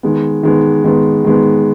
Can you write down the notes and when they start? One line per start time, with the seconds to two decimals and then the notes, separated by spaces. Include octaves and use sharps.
0.03 D#3 G#3 B3
0.43 D#3 G#3 B3
0.84 D#3 G#3 B3
1.25 D#3 G#3 B3